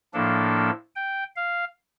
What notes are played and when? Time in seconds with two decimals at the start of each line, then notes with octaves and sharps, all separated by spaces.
0.13 A2 F3 A#3 D4 A4
0.95 G5
1.36 F5